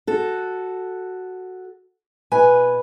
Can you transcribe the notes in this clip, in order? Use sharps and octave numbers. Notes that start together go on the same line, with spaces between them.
F#4 A4
B2 B4 G#5